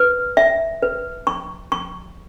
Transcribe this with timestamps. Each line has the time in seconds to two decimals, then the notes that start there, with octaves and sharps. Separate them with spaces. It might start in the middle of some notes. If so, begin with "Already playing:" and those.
Already playing: B4
0.37 E5
0.82 B4
1.27 C#6
1.72 C#6